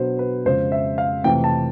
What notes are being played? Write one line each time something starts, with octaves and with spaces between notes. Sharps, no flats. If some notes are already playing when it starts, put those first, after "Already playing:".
Already playing: B2 F#3 B3 D4 C5
B4
F2 C#3 F3 G#3 C5
E5
F5
F2 C3 E3 A3 G5
A5